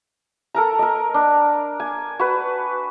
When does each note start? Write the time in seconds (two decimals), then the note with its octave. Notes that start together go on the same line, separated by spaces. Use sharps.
0.54 A4 A#4 A#5
0.79 A#4 D#5
1.14 D4
1.80 G#5
2.19 F#4 B4